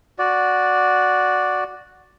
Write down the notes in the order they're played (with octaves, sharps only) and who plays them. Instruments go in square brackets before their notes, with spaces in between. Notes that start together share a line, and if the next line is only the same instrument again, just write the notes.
[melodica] F#4 D5